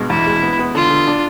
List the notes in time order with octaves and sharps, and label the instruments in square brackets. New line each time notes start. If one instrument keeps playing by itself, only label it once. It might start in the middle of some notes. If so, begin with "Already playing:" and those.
Already playing: [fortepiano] G2 B2 G#3
[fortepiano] E2 [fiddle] E4
[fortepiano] G#3
B3
B3
[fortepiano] D3 [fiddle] F4
[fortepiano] D3
D4